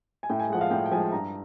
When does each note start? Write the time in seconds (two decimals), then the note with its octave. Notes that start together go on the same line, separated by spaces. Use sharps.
0.23 G#5
0.29 A2 G5
0.40 G#5
0.50 F3 G#3 F#5
0.61 F5
0.70 A2 G5
0.86 G5
0.91 F3 G#3 G#5
1.12 G2 A#5